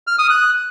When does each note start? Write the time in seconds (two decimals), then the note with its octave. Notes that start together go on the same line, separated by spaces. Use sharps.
0.07 F6
0.18 D#6
0.30 F#6